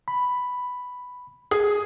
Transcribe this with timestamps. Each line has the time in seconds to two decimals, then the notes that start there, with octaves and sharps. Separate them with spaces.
0.08 B5
1.51 G#4